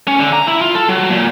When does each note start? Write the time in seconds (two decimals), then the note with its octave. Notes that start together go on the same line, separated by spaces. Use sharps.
0.08 C#4
0.19 D3
0.33 A#5
0.47 E4
0.61 F4
0.75 A4
0.89 F#3
1.10 A#2